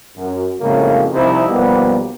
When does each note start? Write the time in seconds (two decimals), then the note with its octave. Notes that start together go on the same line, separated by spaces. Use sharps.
0.16 F#2
0.60 F2 A2 C#3 F#3 G#3 A#3
1.13 C2 C3 F3 D#4 E4 C5
1.49 B1 F3 G3 A#3 B3